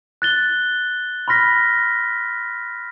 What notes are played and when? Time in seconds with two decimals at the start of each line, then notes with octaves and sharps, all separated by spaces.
0.22 F#6 A6 G7
1.28 B5 C6 F6 A#6 B6